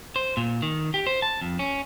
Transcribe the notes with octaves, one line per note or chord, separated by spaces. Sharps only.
C5
A#2
D#3
G4
C5
A5
F2
C#4